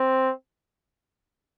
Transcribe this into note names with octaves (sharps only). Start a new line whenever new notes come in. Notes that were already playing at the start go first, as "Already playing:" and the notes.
Already playing: C4